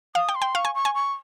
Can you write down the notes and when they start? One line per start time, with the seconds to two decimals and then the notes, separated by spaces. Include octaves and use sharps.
0.15 F5 D#6
0.29 G5
0.35 C6
0.42 G5
0.55 F5 C#6
0.65 G#5
0.75 C#6
0.85 G#5
0.95 C#6